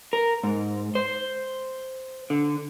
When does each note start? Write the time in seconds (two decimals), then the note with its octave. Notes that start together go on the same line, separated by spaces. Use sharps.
0.13 A#4
0.43 G#2
0.95 C5
2.30 D3